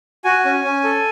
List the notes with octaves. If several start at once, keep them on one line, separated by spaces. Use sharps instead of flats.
F#4 G#5
C#4
C#4
A4